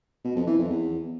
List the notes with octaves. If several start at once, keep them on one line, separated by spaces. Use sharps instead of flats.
B2
F2
E3
F2
E2